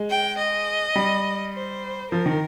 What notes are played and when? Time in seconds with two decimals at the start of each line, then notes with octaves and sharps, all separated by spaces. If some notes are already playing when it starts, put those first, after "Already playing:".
Already playing: G#3
0.10 G5
0.38 D#5
0.96 G3
1.54 C5
2.11 F3 A#4
2.26 D#3